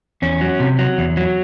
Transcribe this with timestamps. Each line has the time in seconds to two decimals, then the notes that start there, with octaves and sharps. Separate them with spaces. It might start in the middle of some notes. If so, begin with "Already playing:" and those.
0.22 E2 C#4
0.41 F#3
0.60 C3
0.79 F#3
0.98 E2
1.17 F#3